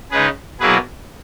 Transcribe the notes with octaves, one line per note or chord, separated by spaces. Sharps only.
C#3 G#3 D#4 G#4 B4
B2 F#3 A#3 E4 G#4 B4